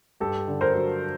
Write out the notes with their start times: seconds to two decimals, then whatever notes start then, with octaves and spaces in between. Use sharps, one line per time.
0.20 G2 G4 A4
0.48 D3
0.61 A#4 C5
0.74 F#3